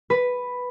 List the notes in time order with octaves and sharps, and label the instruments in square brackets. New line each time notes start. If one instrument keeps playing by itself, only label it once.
[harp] B4